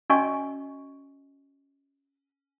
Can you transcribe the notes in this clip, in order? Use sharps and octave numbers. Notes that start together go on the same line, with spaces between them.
C#4 F#4 D5 D#5 G#5 C#6